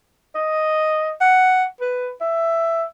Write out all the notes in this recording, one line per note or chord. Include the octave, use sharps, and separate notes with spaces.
D#5
F#5
B4
E5